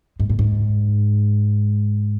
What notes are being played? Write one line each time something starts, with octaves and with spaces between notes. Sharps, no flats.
G#2
A2
G#2